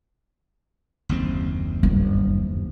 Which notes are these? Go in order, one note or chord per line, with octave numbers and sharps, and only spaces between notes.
F#1 D#2 C4
G1